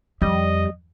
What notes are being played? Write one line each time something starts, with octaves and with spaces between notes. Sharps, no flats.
F2 G3 D#5